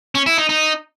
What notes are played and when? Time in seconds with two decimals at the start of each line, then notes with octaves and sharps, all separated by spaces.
0.15 C#4
0.26 E4
0.38 D#4
0.49 D#4